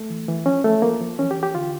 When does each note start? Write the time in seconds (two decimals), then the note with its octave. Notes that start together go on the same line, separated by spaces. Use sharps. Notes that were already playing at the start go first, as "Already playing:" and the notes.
Already playing: A3
0.10 E3
0.28 E3
0.46 F3 C#4
0.64 F3 A3
0.82 F3 A#3
1.00 F3
1.19 E3 C#4
1.31 G4
1.37 E3
1.43 G4
1.55 D3 F4